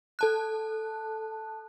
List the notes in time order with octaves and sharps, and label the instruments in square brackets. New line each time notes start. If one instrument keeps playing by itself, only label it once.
[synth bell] A4 A5 F#6